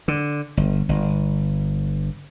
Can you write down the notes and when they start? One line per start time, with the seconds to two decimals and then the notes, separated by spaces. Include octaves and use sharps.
0.08 D3
0.57 G1
0.89 G1